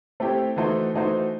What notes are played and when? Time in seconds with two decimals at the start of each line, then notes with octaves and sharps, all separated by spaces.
0.20 A3 C4 E4 G4
0.56 E3 A3 D#4 F#4 C5
0.94 E3 A3 D#4 F#4 C5